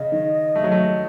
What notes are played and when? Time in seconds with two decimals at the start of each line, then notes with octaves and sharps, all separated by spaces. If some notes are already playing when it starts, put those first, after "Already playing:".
Already playing: C#3 D#5
0.12 D#3
0.55 A3
0.64 F#3
0.72 A3